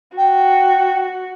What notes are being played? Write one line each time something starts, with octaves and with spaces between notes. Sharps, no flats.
F#4 G5